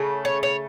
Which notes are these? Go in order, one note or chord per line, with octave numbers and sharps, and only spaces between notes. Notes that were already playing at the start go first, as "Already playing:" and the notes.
Already playing: C#3 A3
C#5
C#5